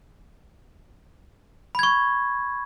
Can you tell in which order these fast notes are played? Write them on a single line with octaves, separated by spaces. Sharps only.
B5 G#6 C#6